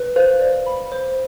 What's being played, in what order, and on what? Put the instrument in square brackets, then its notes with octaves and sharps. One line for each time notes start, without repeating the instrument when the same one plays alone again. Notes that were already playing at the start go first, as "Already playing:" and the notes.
Already playing: [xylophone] B4
[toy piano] C5 [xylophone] F5
[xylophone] D5
B5
C5